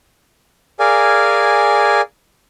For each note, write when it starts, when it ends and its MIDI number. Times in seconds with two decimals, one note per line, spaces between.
0.80 2.01 68
0.80 2.01 70
0.80 2.01 74
0.80 2.01 77
0.80 2.01 80